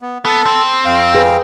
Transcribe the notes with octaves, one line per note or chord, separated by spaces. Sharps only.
B3
B3 A4
C4
F2 F5 G5
G#4 B4